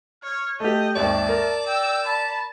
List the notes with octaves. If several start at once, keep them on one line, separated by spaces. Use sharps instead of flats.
C#5 F6
A3 G4 D#5 G6
G#1 D#2 D5 E5 A5
A#4
G5 E6
A5 B5